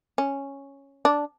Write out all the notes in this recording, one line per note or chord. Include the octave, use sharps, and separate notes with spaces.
C#4
D4